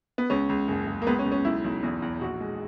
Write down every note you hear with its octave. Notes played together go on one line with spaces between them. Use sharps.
B3
C#2 C#4
C#2
F#1
F#1
A#3
C#2 B3
C#4
C#2
C#4
B1 E4
B1
E2
E2
A#1 F#4
G#3